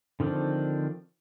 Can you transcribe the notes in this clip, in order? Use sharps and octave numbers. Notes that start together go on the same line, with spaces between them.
D3 D#3 F3 C4 D4